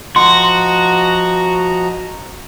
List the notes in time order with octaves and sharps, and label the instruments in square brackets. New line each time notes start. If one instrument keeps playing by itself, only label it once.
[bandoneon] F3 D#5 A#5 [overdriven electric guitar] F#4 [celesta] C6